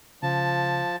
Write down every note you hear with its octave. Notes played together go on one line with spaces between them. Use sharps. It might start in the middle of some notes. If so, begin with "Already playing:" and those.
C#3 F3 A5